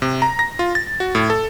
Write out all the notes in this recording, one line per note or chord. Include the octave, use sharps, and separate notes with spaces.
C3
A#5
A#6
F4
A6
F#4
A2
A4